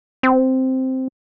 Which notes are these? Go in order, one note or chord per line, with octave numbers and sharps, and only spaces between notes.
C4